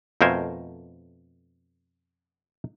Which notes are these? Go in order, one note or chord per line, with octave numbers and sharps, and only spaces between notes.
F2 B2 A3 A#4 C5 G#5